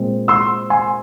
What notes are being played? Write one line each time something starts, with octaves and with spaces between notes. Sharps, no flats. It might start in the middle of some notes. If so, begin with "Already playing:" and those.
Already playing: A#2 G#3 C4
C6 E6
G#5 C6